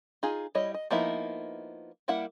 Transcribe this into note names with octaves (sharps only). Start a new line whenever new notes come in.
D#4 F4 G#4
G3 E4 C#5 D#5
D#5
F3 A#3 B3 D#4 E4
G3 A#3 E4 F#5